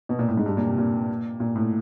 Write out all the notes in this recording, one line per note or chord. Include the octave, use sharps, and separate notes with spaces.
B2
A#2
A2
G#2
G2
A#2
C3
A#2
A#2
A2